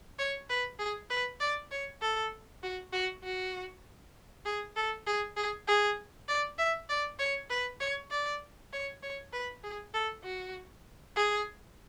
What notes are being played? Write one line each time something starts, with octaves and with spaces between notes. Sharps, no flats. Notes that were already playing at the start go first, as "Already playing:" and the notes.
C#5
B4
G#4
B4
D5
C#5
A4
F#4
F#4
F#4
G#4
A4
G#4
G#4
G#4
D5
E5
D5
C#5
B4
C#5
D5
C#5
C#5
B4
G#4
A4
F#4
G#4